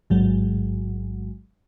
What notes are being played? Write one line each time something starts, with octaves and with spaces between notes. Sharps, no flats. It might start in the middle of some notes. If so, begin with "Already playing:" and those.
A1 G#2 F#3 G#3